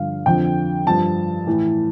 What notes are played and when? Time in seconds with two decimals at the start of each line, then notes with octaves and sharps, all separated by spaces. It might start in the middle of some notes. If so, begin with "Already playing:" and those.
Already playing: G2 D3 F3 F5
0.26 F2 D3 F3 G5
0.87 G2 F3 A5
1.47 A2 E3